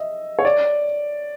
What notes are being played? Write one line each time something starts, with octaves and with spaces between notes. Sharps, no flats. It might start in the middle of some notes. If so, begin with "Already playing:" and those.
Already playing: D#5 E5
C#5
D5